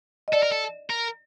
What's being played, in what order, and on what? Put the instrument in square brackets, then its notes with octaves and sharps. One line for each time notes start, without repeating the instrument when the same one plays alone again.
[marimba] D#5
[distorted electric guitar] A4 [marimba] D5
[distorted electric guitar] A#4
A4
A#4